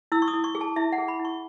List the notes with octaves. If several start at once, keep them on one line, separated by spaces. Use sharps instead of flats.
E4 E6
C#6
D#6
E4
C#6
G#4
A5
E4 E5
F#5
G#4
B5
E4
C#6